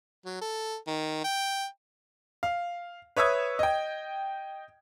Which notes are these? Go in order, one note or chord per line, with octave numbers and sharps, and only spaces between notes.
F#3
A4
D#3
G5
F5
B4 C#5 E5 D#6 E6 G#6
D#5 G5